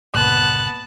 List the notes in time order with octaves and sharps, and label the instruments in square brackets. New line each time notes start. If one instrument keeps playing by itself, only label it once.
[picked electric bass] G1 C#2 A#2 [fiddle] B3 A5 [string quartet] F#6